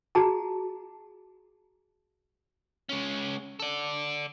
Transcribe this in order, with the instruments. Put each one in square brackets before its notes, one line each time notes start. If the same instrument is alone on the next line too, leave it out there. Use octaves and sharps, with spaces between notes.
[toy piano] F#4 G#4 A5 A#5
[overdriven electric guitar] G#3 C#4
A4 D5